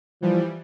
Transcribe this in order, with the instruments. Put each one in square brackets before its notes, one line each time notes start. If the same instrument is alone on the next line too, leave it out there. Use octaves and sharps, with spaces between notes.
[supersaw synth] E3 G3 [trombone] F3